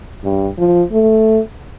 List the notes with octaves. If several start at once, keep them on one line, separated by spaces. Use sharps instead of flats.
G2
F3
A3